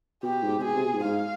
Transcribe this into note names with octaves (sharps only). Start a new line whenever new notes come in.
B2 G4
G#2
C3
B2 G#4
C3
B2
G#2
G#2 F5